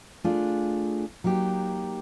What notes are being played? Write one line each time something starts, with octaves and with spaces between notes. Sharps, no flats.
A3 D4 F4 G#4
F#3 A#3 D#4 G4